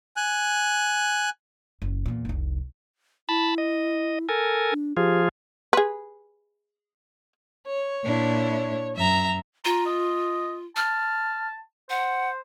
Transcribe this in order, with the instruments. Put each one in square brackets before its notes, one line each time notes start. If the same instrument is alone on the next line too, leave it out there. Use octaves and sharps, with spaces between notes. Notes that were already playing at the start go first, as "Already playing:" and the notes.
[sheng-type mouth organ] G#5 F#6
[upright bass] F#1
E2 A#2
F1 C2
[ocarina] E4 [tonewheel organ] A5 B5
[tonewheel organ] D#5
A4 A#4 G#5
[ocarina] D4
[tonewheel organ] F3 F4 G#4 [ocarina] G4
[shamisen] G#4 B4
[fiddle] C#5
[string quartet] A#2 D4 E4
[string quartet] F#2 [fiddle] E5 A#5
[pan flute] F4 [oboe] A#5
[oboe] D#5
[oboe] A5 [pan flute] F6
[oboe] C5 [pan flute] F#5